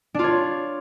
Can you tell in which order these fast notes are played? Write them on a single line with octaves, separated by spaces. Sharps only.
D4 F4 C#5